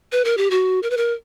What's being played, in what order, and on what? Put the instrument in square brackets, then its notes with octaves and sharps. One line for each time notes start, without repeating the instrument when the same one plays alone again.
[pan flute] B4
A#4
G4
F#4
A#4
B4
A#4